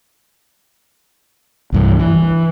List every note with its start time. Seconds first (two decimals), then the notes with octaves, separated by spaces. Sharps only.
1.72 C2 G2 E3
2.00 E3